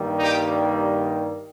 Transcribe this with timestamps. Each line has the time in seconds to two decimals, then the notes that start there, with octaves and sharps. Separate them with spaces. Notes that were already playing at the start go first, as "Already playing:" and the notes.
Already playing: G2 D#3 G3 A#3
0.20 D#4 G4